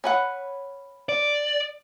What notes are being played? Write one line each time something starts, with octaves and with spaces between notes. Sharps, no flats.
C#4 B4 F#5
D5